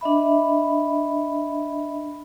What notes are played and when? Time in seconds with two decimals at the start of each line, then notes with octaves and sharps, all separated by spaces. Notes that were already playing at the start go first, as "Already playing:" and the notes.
0.01 D4 D#5 E5 B5